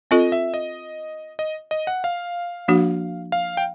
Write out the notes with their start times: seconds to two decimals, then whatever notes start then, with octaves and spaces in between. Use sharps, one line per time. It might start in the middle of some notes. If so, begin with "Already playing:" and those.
0.11 C4 F4 A4 D#5
0.32 E5
0.54 D#5
1.39 D#5
1.71 D#5
1.87 F#5
2.04 F5
2.68 F3 A#3 D4 F#4
3.32 F5
3.57 G5